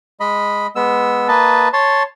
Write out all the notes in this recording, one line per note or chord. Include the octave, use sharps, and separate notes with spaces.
G#3 D#5 B5
G#3 B3 E6
A#3 B4 D#5 A5
C#5 A5 C6